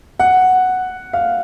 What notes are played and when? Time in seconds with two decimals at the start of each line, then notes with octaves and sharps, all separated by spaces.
0.20 F#5
1.13 F5